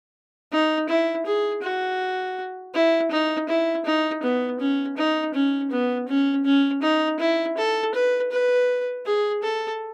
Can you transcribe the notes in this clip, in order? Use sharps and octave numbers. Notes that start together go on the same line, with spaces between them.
D#4
E4
G#4
F#4
E4
D#4
E4
D#4
B3
C#4
D#4
C#4
B3
C#4
C#4
D#4
E4
A4
B4
B4
G#4
A4